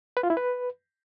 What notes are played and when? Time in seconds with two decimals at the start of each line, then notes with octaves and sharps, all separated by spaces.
0.17 B4
0.23 F4
0.30 E4
0.37 B4